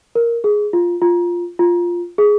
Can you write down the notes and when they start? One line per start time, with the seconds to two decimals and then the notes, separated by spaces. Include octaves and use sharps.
0.15 A#4
0.44 G#4
0.73 F4
1.01 F4
1.59 F4
2.18 G#4